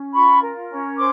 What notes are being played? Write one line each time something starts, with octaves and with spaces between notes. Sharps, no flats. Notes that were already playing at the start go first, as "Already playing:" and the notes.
Already playing: C#4
F4 B5 C#6
A#4
C#4
C5 C6 D6